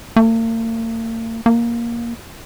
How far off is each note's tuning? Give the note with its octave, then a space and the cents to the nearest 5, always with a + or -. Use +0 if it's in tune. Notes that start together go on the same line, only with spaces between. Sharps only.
A#3 -45
A#3 +10